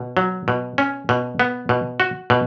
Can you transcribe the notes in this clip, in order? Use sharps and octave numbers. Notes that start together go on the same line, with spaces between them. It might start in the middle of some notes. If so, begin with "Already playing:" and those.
Already playing: B2
F#3
B2
C#4
B2
B3
B2
F#4
B2